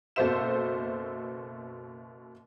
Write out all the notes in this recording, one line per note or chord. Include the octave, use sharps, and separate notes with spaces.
F#1 B2 A4 C5 E5 E7